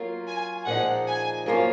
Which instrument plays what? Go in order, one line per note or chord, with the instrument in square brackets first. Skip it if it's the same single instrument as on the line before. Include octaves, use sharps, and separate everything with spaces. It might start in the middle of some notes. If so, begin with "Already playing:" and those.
Already playing: [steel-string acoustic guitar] F#3 A#3 F4
[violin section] G#5
[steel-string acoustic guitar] A#2 F3 G#3 D#4 [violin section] F#5
[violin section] G#5
[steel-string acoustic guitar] F#2 F3 A#3 C#4 F4